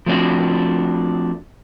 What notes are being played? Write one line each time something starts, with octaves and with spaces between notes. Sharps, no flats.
F3 A3 C4 D4 F#4